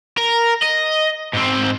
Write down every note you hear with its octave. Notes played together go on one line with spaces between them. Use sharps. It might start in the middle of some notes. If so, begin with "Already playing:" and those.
A#4
D#5
G#2 C4